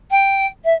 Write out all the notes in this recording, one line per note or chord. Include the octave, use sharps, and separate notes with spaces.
G5
E5